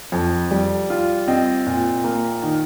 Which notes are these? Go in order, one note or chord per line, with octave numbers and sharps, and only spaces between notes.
F2
G3
F4
C4 D#5
A#2
A#3
D#3